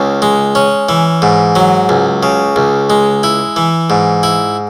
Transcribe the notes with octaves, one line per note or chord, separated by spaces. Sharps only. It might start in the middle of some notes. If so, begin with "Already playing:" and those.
Already playing: C#2 C#3
G#3
C#4
E3
G#2
F#3
C#2
C#3
C#2
G#3
E4
E3
G#2
E4